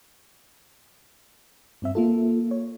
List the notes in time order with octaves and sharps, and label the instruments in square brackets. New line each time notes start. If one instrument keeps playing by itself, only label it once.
[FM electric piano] G2 C4 E5
A#3 F4 A4
C#5